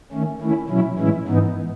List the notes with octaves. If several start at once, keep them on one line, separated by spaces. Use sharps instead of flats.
D#3 A3 C#4
D#3 A3 C#4 E4
B2 F#3 C#4 E4
A2 E3 G#3 C#4 E4
G#2 E3 B3 D#4